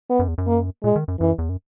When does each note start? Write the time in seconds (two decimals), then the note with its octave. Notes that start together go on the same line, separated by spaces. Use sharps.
0.10 B3
0.19 F#2
0.28 E2
0.38 F#2
0.47 A#3
0.83 A#2 G#3
0.96 D#3
1.08 F#2
1.20 F#2 E3
1.38 E2
1.49 F#2